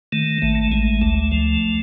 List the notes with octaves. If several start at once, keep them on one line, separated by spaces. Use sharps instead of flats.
D#3 A3
A1 A3
A1 G#3
D2 A3
F3